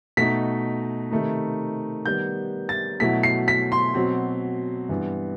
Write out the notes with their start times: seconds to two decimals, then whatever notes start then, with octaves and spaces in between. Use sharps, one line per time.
0.17 B2 A3 D#4 B6
1.11 C3 D#3 A3 D#4
2.06 D#3 G3 B3 G6
2.69 A6
3.00 B2 F#3 A3 E4 B6
3.23 C7
3.48 B6
3.72 C6
3.95 B2 F#3 C4
4.89 G2 E3 B3